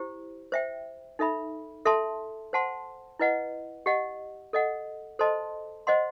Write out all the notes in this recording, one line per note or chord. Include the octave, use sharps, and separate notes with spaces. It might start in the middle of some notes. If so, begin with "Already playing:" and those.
Already playing: E4 G4 C5
C5 E5 G5
D#4 A4 E5 B5
A4 E5 A5 C6
C5 F#5 A5 C6
E4 B4 D#5 F#5
G4 D#5 F#5
A4 D#5 F#5
A4 C5 D#5 A5 C6
C5 D#5 F#5 C6